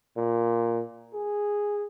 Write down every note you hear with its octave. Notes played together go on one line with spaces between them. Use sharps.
A#2
G#4